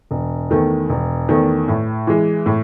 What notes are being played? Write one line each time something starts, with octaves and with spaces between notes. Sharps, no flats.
E1
E2 D#3 A3
E1
E2 D#3 A3
A2
E3 G#3
A2